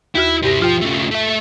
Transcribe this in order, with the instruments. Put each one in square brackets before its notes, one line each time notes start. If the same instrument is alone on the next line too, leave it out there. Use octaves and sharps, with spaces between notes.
[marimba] D#2 F#4 F6 [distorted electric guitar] E4
[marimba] G2 G4 A#6 [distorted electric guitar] C3 E4
[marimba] B2 F4 G5 [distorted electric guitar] F3
[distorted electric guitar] C#3 A3
A3 E5